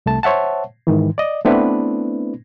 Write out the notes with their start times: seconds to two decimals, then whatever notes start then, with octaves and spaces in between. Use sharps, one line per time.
0.06 C2 A3 A5
0.23 C5 C#5 E5 F#5 A5
0.87 G#2 D#3 E3
1.18 D5 D#5
1.45 A3 B3 C4 D4 E4 B4